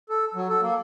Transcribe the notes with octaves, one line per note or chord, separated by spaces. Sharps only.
A4
F#3
A4
A#3